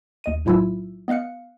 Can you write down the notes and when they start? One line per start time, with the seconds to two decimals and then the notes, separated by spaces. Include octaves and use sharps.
0.24 D#2 D#5 D#7
0.45 B1 A2 F#3 E4 F4 E6
1.08 B3 D#5 F5 F#6 C#7